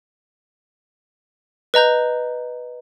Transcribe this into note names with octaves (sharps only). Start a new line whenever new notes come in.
B4 D#5 A#5 G6